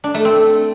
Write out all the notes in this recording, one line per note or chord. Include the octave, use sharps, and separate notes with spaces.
D4
A3
C4